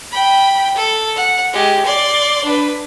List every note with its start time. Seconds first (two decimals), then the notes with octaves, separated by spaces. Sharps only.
0.11 G5 B5
0.76 A4
1.16 F#5
1.53 G#3 G4
1.86 D5 C6
2.45 D4 B4